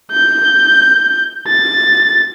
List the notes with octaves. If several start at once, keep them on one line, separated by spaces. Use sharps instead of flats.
G6
A6